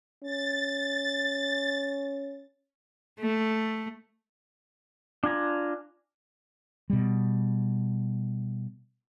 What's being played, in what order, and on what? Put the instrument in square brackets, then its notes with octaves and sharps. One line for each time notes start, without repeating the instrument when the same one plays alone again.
[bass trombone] C#4 [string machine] A6
[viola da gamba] A3
[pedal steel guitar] D4 F4 G#5 A#5
[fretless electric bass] B2 G3